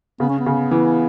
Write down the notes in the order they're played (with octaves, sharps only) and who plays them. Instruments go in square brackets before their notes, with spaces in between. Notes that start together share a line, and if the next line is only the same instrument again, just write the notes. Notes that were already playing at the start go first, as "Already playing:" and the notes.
[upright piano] C#3 [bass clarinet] B3
[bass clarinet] C#4
B3
[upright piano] C#3
E3